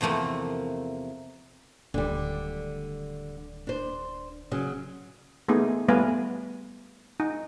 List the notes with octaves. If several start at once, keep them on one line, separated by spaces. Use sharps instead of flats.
E2 C3 F3 A3 A#3
D1 D3 D#3 G3
D4 C5
C#3 F#3
A3 B3 D#4 G#4
G3 A3 B3 B4 F5 G#5
D#4